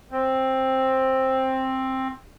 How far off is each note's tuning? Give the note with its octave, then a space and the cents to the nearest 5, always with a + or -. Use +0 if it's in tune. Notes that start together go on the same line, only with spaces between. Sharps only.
C4 +10